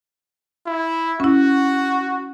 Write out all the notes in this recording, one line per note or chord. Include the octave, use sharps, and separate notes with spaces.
E4
C#4 E4 F#4